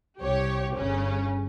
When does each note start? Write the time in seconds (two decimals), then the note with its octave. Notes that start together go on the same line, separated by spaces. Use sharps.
0.20 C2 G4 C#5
0.76 G1 C#3 C#4